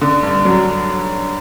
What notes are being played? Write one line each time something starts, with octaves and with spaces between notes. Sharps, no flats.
D3
G2
F#3